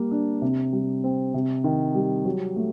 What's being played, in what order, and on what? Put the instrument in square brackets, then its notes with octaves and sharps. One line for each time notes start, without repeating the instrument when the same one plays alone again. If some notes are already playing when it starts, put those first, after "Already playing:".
Already playing: [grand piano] G3 A#3
D4
C3
G3
C4
C3
D#3
G3
F#3
A3